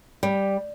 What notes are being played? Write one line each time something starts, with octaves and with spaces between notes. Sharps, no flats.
G3